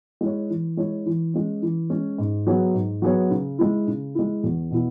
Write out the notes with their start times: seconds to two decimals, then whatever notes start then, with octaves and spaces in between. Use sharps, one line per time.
0.21 G#3 E4 C#5
0.50 E3
0.77 G#3 E4 C#5
1.06 E3
1.34 G#3 C#4
1.62 E3
1.90 G#3 C#4
2.18 G#2
2.47 F#3 B3 G#4 C#5
2.74 G#2
3.02 F#3 B3 G#4 C#5
3.31 C#3
3.59 G#3 E4
3.87 C#3
4.15 G#3 E4
4.43 E2
4.71 B2 B3 E4